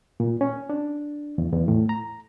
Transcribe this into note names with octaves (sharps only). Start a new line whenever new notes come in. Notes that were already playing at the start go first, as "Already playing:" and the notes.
A#2
C#4
D4
E2
E2
A2
A#5